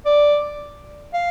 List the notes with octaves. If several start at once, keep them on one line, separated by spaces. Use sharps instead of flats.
D5
F5